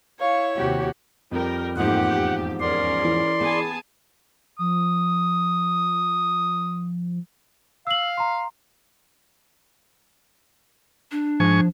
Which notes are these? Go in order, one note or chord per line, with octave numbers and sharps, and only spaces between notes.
E4 C#5 F5 C#6
D#2 C3 F#4 G4
F2 G3 A#4 G5
E2 G#2 F3 A3 A#3 G4 F#5
C#4 G#4 A#4 D5 C6
E3
B3 G#4 G#5 A5
F3 D#6
F5 E6 F#7
A#5 C6
D4
G#2 F3 G#5 C#6